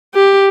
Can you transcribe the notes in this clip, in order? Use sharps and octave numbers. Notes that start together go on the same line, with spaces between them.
G4